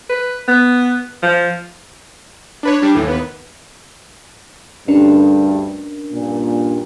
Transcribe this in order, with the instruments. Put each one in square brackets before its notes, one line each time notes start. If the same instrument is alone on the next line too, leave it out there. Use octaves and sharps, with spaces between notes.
[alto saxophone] B4
B3
F3
[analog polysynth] D4 B4 C#5
G3 D4
D#2 A2 E3
D#2 B3
[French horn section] D2 G2 [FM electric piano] C#4 D4 A#4
[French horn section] G2 A#2